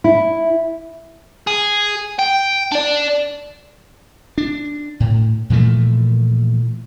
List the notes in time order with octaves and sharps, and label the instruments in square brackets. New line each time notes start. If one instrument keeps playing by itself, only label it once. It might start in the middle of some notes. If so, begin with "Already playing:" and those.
[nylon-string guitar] E4
[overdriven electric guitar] G#4
G5
D4 D5
[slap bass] D4
A2
A#2 E3 F3 A3